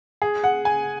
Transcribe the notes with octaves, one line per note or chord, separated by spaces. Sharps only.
G#4
F#5
G#5